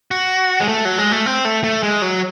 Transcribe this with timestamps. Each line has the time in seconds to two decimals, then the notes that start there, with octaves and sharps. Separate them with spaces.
0.11 F#4
0.60 G#3
0.68 A3
0.85 F#3
0.98 G#3
1.12 A3
1.26 C4
1.45 A3
1.64 A3
1.83 G#3
2.02 F#3